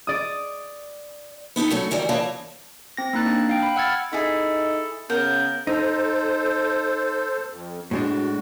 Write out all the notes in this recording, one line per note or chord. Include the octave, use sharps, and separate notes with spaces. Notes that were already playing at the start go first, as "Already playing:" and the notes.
D5 D#6
B3 D#4 G4 A4
F#3 A3 C#4
D#3 E3 F#3 G3
E3 A#3 C#5 D#5 A5
C4 A#6
A#3 D#4 F#6 A6
D4
F5 G5
B5
F#5 E6 F6 G#6 A6
D#4 E4 G#4 A4
C#3 B3 A#4 G6
D#4 A4 C5
F2
A2 G#3 D4 F#4